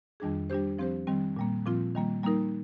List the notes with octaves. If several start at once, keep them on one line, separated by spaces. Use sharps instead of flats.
F2 D#3 G3 D4 G#4
G3 D4 G4 C5
F3 C4 G4 C5
D#3 G3 C4
A#2 G3 A#3
A#2 F3 C4 F4
D#3 G3 A#3
G3 A#3 D#4 A#4